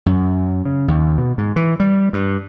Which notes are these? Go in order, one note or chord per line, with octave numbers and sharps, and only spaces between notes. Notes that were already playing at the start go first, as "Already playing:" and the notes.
F#2
C#3
D#2
B2
G#2
E3
G3
G2